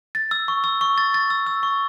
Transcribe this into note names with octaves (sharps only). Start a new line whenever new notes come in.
A6
E6
C#6
E6
C#6
A6
A6
E6
E6
C#6